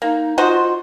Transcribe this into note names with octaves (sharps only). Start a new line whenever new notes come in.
A#3 D#4
D#4 F4 F#4 C5